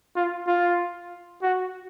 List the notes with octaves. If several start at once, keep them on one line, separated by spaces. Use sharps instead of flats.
F4
F4
F#4